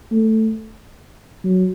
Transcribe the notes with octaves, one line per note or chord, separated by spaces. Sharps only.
A3
F#3